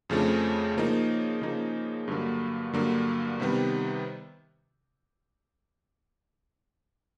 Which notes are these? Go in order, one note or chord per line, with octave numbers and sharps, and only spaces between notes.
F2 C#3 F3 A3 D4
C#3 F3 A#3 D#4
C#3 F3 A#3 D#4
G2 D3 F#3 A#3
G2 D3 F#3 A#3
C3 D#3 G3 B3